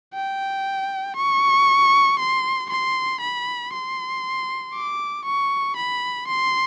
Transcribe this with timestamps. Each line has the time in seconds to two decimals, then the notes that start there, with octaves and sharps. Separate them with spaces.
0.14 G5
1.16 C#6
2.19 C6
2.70 C6
3.21 B5
3.73 C6
4.75 D6
5.25 C#6
5.77 B5
6.28 C6